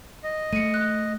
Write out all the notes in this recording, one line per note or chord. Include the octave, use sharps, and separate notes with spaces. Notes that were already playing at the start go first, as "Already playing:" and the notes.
D#5
A3 C#7 D#7
F#6